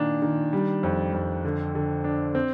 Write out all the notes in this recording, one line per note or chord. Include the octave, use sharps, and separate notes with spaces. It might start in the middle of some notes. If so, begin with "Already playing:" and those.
Already playing: A#2 D#3 D4
D#3
G3
F2
F2
D3
D3
D4
C4